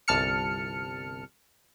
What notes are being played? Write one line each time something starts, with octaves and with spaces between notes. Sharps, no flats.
G1 C2 A5 F6 C#7